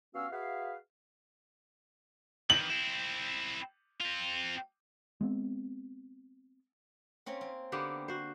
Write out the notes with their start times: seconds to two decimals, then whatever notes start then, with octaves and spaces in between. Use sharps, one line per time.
0.14 G2 B3 C#4 F#4 F5 E6
0.31 F#4 G#4 B4 E5 F5
2.50 D#3 E3 F#7
2.70 C4 E4
4.01 C4 F4
5.21 G#3 B3 C4
7.26 A#3 C4 C#4
7.41 C4
7.72 D3 A#3 B3 G4
8.08 F#4 C5